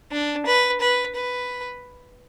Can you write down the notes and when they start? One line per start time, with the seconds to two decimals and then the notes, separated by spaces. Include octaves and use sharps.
0.12 D4
0.46 B4
0.81 B4
1.15 B4